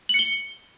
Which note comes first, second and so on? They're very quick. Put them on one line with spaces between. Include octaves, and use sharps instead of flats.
F#7 C#7 G7